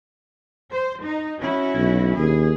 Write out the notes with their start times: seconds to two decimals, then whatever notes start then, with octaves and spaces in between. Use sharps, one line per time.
0.72 C5
1.02 D#4
1.40 C#4 E4 F#4
1.75 B1
2.17 D#2 G#4